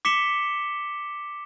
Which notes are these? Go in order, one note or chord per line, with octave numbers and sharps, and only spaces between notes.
D6 B6 C#7 E7 G7